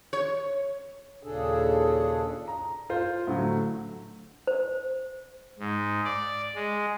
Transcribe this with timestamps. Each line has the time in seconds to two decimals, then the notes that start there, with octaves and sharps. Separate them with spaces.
0.13 C#5
1.23 D#2 A#2 C#3 D4 G#4 A4
2.48 A#5
2.90 F4 C5
3.27 A2 D3 F#3
4.47 C5
5.59 G#2
6.05 D5
6.55 G#3